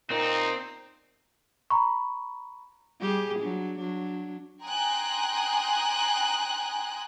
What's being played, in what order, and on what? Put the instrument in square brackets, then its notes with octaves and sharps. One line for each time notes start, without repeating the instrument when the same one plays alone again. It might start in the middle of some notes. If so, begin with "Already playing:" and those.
[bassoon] A#2 [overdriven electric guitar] C4 [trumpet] D#4
[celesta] A#5 B5 C#6
[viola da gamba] G3 G4 G#4
F#3 D4
F#3 D4
[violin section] G5 G#5 A#5 C6 D#6 F#6